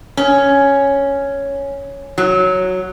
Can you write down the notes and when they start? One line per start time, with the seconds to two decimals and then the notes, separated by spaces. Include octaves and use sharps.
0.17 C#4
2.18 F#3